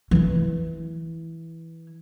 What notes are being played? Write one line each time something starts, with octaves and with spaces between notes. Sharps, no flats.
E3 E4